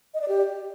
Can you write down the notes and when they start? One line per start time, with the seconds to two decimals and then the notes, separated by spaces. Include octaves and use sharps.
0.14 D#5
0.21 D5
0.28 G4